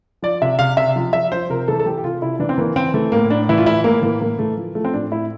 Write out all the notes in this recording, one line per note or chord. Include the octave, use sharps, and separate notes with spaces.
F3 D5
C3 E5
C3 F5
C3 E5
F3
F3 E5
F3 C5
C3 A#4
E3 A4
A4
E3 G4
G4
C3 F4
C3 E4
E3 D4
C4
E3 A#3
E3 C4
E3 A3
A2 A#3
A2 D4
E3 E4
F4
A2 E4
A2 A#3
E3 A#3
E3 A#3
E3 A3
F3
F3 A3
C4
A2 D4
A2 E4